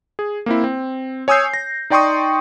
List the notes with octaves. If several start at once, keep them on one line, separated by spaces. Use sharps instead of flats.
G#4
A#3 C4 E4
C4
C#5 G#5 D#6 E6 G6 C7
A#6
D#4 D5 G5 C6 C#6 D#6